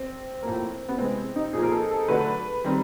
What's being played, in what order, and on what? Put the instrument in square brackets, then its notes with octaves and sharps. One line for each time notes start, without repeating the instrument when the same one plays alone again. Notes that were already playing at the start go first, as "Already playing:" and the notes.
Already playing: [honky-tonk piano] C4
[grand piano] A2 F3 A#3
[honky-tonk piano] B3
[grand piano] C3 E3 G#3 [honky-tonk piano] C4
[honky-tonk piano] D#4
[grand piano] A#2 F3 A#3 [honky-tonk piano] G#4
[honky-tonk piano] A#4
A4
A4
[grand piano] D3 F#3 A3 D4 F#4 [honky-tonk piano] B4
[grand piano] D#3 G3 C4